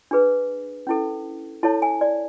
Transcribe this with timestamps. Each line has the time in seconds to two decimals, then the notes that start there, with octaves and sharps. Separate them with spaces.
0.11 D4 G#4 B4
0.87 C#4 E4 A4
1.63 E4 A4 C#5 A5
1.82 G#5
2.01 D5